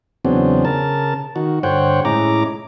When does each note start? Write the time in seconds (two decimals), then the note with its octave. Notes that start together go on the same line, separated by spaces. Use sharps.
0.25 E2 C#3 F#3 B3 C4 D4
0.65 C#3 A#4 A5
1.36 D#3 F#4
1.63 G2 D3 C5 C#5 F#5 G5
2.05 A2 G#3 C#4 E4 A#5 D6